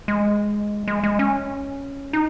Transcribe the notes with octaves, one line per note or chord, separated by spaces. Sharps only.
G#3
G#3
G#3
C#4
D#4